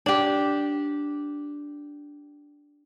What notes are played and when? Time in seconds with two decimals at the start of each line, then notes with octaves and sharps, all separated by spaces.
0.06 D4 G4